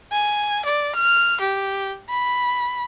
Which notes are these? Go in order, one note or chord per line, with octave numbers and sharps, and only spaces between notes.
G#5
D5
F6
G4
B5